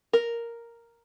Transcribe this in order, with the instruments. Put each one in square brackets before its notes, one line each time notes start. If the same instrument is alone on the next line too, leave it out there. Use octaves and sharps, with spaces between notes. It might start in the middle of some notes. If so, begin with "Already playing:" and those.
[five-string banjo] A#4